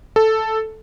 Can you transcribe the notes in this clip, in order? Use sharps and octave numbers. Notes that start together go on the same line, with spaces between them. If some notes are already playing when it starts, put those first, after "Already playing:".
A4